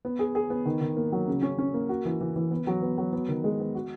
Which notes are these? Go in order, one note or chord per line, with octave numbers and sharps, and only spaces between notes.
B3
G#4
G#4
B3
D#3
D#3
A#3
F#3
C#3
C#4
C#4
A#3
F#4
E3
E3
E3
B3
F#3
B3
F#3
B3
D#3
G#3
B3
F#4